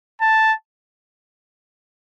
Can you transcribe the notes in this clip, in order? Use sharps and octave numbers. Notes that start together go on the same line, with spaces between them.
A5